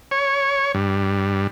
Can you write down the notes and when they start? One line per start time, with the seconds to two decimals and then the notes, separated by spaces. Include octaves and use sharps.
0.11 C#5
0.75 G2